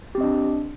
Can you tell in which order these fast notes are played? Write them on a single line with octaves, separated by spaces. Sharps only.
G4 C4 D#5 D4